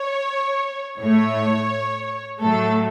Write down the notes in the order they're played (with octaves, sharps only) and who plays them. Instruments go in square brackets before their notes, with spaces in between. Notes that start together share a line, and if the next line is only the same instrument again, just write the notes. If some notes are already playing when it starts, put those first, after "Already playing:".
Already playing: [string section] C#5
A2 A3 C#5
A2 F#3 A3 A4